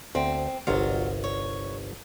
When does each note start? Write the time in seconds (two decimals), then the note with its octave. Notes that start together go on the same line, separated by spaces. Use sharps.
0.15 D2 C4
0.67 G1 C2 F#3 F4 F5
1.24 C#5